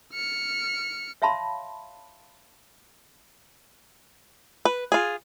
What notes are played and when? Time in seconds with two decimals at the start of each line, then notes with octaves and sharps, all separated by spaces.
0.14 F6 C#7
1.22 C#5 E5 F5 A5 B5 C6
4.65 B4
4.92 F4 G#4